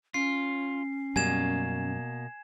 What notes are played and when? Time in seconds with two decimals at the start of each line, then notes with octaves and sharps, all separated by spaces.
0.14 C#4 F4 C7
1.16 F#2 B2 G3 A#3 G#5 G#6 E7